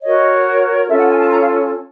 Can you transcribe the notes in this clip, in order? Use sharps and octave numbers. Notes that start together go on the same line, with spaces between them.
F#4 A#4 C#5 D#5
C#4 F4 A4 E5
F#5
G#5
A5
A#5
F5